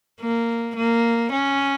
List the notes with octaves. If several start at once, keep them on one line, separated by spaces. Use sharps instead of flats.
A#3
A#3
C#4